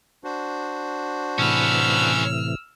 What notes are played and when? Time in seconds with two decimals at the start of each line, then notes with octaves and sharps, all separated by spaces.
0.24 D4 F#4 C5
1.39 A2 C3 E3 C#4 B4 E6 F6